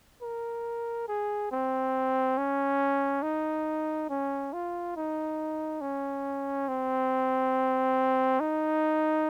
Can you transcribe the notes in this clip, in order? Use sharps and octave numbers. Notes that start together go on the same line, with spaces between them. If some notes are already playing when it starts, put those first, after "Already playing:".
A#4
G#4
C4
C#4
D#4
C#4
F4
D#4
C#4
C4
D#4